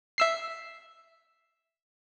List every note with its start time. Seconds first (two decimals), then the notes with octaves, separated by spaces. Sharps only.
0.18 E5 E6 C7